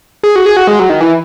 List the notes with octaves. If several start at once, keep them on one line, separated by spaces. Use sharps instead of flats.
G#4
F#4
G#4
F#4
G#3
F#3
D#3
E3